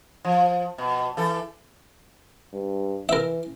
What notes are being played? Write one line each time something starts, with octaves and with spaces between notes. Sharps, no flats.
F3
B2
E3 A4
G2
E3 A#4 E5